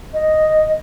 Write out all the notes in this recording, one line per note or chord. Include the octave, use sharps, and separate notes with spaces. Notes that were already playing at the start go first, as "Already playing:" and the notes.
D#5